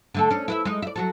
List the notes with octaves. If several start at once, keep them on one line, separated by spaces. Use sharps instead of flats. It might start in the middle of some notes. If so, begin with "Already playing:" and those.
D3 A3 A4
C#4 D4
E4 B4 E5
G#3 D#4
D5 E5
F#3 F#4 A4